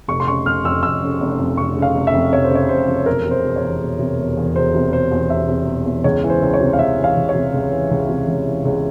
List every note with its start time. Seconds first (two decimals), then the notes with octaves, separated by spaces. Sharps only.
0.08 F1 C#6
0.20 C6
0.27 C#3 C#6
0.46 F1 F6
0.64 F2 E6
0.83 F1 E6
1.02 C#3
1.20 F1
1.39 F2
1.57 F1 C#6
1.77 C#3
1.82 F5
1.95 F1
2.07 E5
2.14 F2
2.32 F1 C#5
2.44 C5
2.51 C#3 C#5
2.69 F1 C5
2.88 F2
3.06 E1 A#4
3.25 C3
3.31 C5
3.44 E1
3.56 C#5
3.63 E2
3.81 E1
3.99 C3
4.18 E1
4.37 E2
4.56 E1 C5
4.75 C3
4.93 E1 C5
5.12 E2
5.30 E1 E5
5.48 C3
5.68 E1
5.86 E2
6.04 C#2 C#5
6.24 E3
6.30 C5
6.42 C#2
6.54 C#5
6.60 C3
6.73 F5
6.79 C#2 E5
6.97 E3
7.04 F5
7.17 C#2
7.29 C#5
7.35 C3
7.54 C#2
7.72 E3
7.91 C#2
8.09 C3
8.28 C#2
8.46 E3
8.65 C#2